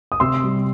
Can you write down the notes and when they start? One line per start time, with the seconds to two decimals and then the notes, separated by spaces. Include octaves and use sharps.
0.12 D#6
0.20 C3 C6 E6
0.44 G3